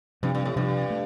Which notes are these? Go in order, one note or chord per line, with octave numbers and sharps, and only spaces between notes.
G2 C3 F3 C4
G2
A2
G2 C3 F3 C4
A3